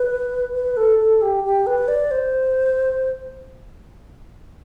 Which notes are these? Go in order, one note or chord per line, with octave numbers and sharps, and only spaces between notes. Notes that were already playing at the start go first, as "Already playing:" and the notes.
Already playing: B4
B4
A4
A4
G4
G4
B4
D5
C5